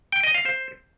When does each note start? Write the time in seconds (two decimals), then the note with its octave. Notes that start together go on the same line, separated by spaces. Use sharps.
0.12 G5
0.23 D#5
0.34 F5
0.45 C5